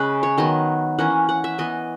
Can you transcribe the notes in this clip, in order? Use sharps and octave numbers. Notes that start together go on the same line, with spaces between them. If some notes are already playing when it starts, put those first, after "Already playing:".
Already playing: C#3 G#3 C#4 B4 D#5
C#5
D#3 F#3 B3 D#5
E3 A#3 C#4 F#5
F#5
E5
E3 B3 D#5